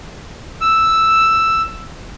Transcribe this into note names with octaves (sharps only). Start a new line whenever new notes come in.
E6